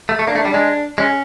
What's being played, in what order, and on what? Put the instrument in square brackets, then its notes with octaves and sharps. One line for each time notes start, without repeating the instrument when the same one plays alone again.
[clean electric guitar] A3
A3
[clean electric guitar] A#3 [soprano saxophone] D4
[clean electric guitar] A3
[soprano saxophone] D4
[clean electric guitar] G3
[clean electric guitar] G#3 [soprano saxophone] D4
[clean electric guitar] G#3 [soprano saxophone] C#4